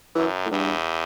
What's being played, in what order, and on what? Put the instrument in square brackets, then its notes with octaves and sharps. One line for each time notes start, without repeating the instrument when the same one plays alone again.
[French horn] F#2 [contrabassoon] E3
[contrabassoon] A2
[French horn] E2 [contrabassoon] G2